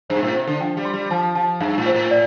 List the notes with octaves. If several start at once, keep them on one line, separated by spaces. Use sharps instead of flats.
G2 C5
C3
A2
C3 C5
D3
F3 G5
G3
C6
G3
F3 A5
F3 A5
G2 F5
A2
C5
A2
D5